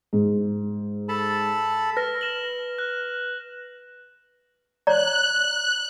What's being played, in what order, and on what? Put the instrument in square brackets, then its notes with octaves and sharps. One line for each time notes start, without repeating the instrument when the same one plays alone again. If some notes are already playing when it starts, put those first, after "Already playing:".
[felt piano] G#2
[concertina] A4 A5 B5
[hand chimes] B4 [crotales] F6 A#6
[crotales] A#6 E7 F#7
F#6
[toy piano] C#5 D5 A#5 [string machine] F#6